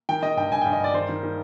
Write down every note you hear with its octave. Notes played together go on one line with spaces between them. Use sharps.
D#3 G5
D#3 D#5
G2 G5
G2 G#5
G5
G2
D#5
G2 D5
D#3 C5
D#3
D#3